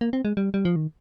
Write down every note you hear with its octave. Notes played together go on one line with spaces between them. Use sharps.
A#3
C4
G#3
G3
G3
F3
D#3